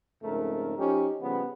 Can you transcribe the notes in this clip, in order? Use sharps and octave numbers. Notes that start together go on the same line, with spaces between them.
F2 G#2 C#3 A3 A#4
F3 C#4 D#4 G4
C#3 F3 G3 B3